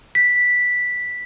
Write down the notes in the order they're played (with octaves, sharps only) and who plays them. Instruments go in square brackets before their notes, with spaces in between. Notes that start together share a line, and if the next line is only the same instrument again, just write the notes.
[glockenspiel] B6